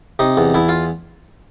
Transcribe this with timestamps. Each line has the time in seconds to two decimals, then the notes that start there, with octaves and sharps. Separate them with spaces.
0.19 C3 D#4
0.37 E2
0.54 E2 E4
0.69 F4